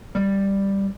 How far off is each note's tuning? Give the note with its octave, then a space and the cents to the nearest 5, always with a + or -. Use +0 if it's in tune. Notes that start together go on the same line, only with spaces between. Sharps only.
G3 +5